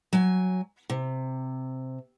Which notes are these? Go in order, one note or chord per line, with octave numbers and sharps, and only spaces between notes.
F#3 G#5
C3